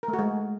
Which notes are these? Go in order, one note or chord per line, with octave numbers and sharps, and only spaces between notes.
A#4
A3
F#4
G#3